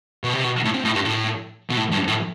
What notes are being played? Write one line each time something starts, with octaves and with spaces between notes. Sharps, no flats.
B2
C3
B2
A2
C3
A2
G2
A2
B2
A2
G2
A2